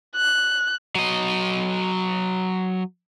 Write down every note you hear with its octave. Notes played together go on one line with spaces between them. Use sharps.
F#6
F#3 D#5